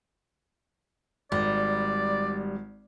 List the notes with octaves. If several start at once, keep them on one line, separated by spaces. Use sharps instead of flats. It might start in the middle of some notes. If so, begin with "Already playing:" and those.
G#1 G3 D5